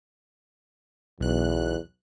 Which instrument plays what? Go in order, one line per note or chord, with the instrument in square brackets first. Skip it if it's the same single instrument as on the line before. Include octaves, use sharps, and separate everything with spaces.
[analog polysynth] B1 F#6 [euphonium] E2